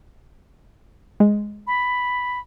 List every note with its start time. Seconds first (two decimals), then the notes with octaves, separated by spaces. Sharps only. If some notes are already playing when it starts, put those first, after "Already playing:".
1.20 G#3
1.67 B5